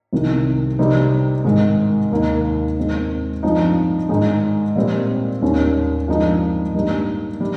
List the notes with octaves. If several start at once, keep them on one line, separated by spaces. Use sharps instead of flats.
C2 C3 D#3
C3 G3 C4 D#4
G#2 D#3 G#3
D#2 D#3 A#3 D#4
D#2 D#3 G#3 C4
G2 F3 C4 D#4
G#2 D#3 G#3 D#4
A#2 G3 C4
D#2 D#3 G3 C#4
G2 F3 G#3 C4 D#4
G2 G3 A#3 D#4
G3